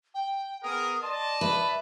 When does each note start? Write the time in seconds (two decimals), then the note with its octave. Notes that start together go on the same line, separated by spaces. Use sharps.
0.14 G5
0.63 B3 G#4 A#4 D#6
1.03 D5 D#5 A5 C6
1.41 B4 E5